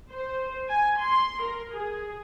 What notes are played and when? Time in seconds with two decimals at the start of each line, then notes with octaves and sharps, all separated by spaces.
0.11 C5
0.69 G#5
1.01 C6
1.43 A#4
1.72 G#4